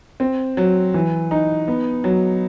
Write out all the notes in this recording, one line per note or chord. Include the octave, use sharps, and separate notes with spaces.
C4
F#3
E3
D#4
B3
F#3